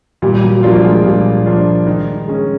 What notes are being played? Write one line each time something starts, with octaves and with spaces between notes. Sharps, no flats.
A#2 G3
F#3
F3 G3 A#3 D4 F4
G#3
A#2 G3
F3 A#3 D4 F4
D#3
G#3 C#4